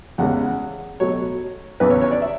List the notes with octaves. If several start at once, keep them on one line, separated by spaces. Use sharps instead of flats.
E2 C#3 G#3 F#5
B2 F#3 A3 C#5
E2 C#3 E3 B4
C#5
C#5
D5
E5